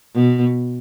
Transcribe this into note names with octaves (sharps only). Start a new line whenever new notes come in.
B2